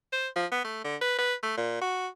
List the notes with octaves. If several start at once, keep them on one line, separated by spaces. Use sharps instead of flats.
C5
F3
B3
A3
D3
B4
B4
A3
A#2
F#4